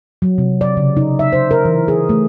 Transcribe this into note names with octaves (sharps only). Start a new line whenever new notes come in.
F#3
C3
D5
C#3
D#4
E5
C5
A#4
E3
G#4
A3